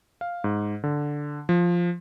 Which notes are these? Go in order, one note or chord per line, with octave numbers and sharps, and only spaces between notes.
F5
G#2
D3
F3